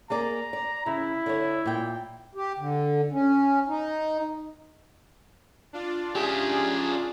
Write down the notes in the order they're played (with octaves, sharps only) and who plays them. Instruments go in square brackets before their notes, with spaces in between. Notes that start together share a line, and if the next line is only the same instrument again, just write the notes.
[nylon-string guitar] A#3 G#4 D5 [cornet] A#5
[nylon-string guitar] D5
[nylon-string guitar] C#3 [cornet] E4
[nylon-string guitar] D3 D4 C#5
A#2 G5
[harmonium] G4
D3
C#4
D#4
[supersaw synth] D4 F4 D5
[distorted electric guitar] C#4 E5 [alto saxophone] G4 [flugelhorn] G#4